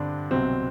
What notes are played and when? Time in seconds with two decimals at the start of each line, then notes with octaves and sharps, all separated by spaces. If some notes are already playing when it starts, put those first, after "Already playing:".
Already playing: G2 D3 C4 D4
0.31 C2 B2 F#3 C4